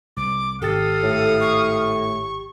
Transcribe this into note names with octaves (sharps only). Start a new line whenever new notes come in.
C2 D6
G#1 G4 A4 F5 D#6 A6
A2
C#6